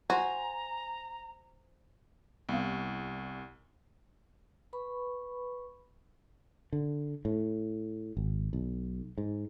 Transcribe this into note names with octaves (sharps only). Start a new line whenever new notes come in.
F#4 C5 G#5 A#5
C2 B3 F5
B4 B5 C#6
D3
A2
G#1
B1
G#2